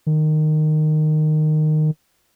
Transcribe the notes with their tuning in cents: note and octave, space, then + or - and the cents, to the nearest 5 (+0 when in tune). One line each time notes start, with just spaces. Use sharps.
D#3 -15